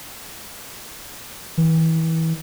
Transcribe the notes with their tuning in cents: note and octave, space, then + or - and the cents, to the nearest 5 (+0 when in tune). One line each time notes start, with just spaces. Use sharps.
E3 -30